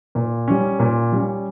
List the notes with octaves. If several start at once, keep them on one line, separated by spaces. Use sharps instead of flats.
A#2
G3 C#4
A#2
G3 C#4